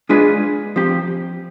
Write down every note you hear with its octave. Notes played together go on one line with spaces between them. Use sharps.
G#3 D4 F4 G#4 B4
F3 C4 G4